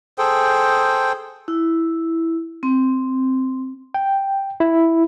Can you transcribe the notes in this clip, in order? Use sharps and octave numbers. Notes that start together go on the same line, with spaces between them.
G#4 A4 C5 G5
E4
C4
G5
E4